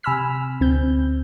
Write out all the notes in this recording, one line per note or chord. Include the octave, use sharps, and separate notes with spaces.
C3 G#5 B5 E6 F6 B6
D2 C4 G6